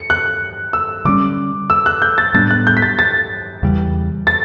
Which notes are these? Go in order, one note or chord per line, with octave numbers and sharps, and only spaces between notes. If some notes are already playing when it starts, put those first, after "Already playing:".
Already playing: C#7
F#6
E6
D3 G3 C#4 D6
E6
F#6
G6
A6
A2 G3 B3 D4 A6
F#6
G6
B6
A6
A6
E2 C#3 E3 G3
A6